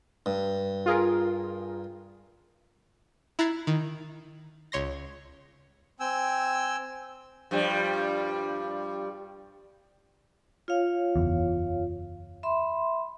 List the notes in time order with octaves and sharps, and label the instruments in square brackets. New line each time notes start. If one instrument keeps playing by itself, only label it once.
[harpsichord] G2
[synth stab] F4 G#4 A#4
[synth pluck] E4 A#5 F#6 G#6 A6 C7
D#3
C#2 C#5 C6 A#6
[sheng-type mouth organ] C4 G5 G#5 E6
[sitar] G2 F3 G3
[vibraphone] F4 C#5 F5
[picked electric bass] F#1 E2
[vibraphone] E5 B5 C6